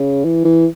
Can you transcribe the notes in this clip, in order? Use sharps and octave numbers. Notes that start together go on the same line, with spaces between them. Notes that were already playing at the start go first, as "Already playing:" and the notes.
Already playing: C#3
E3
E3